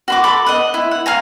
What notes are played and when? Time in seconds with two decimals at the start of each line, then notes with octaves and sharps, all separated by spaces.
0.08 F#4 B5 D6
0.24 A4 B5 D6
0.46 D#5 F#5
0.74 E4
0.91 F#5
1.06 F5 G#5 A#5